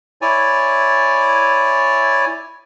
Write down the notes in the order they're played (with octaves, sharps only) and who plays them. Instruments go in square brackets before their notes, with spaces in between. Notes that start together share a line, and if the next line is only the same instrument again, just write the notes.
[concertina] E4 C#5 D5 G#5